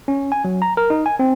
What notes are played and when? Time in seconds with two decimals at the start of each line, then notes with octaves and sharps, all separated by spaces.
0.08 C#4
0.32 G#5
0.45 F#3
0.62 A#5
0.77 A#4
0.90 D#4
1.06 G#5
1.19 C4